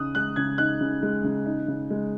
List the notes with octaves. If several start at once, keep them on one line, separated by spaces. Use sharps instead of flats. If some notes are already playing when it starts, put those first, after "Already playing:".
Already playing: C#3 D#4 D#6 F#6
G#3 F#6
C#3 G#6
D#4 F#6
C#3
G#3
C#3
D#4
C#3
G#3